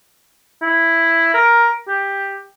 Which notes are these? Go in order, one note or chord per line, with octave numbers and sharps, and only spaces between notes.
E4
A#4
G4